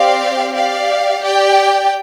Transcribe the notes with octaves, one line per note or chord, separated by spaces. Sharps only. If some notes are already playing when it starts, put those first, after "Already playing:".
Already playing: C4 G4 D5 F5
G4 D5 F5
G4 D5 G5